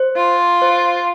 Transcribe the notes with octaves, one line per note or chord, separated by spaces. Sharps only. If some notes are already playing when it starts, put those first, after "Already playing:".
Already playing: C5
F4
C5